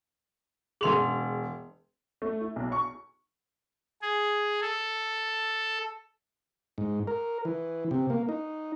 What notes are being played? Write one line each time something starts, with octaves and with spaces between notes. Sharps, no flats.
E1 G#4 C6 F7 F#7
A3
E4
B1
C#6
G#4
A4
G#2
A#4
E3
C3
A#3
D#4